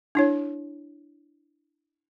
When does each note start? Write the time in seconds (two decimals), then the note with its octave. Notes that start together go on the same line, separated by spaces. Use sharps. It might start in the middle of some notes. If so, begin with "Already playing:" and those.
0.15 D4 E4 C#5